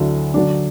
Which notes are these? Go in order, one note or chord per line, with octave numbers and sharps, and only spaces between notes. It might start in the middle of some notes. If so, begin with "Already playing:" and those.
Already playing: D2 D3 F#3 A3 E4
D3 F#3 D4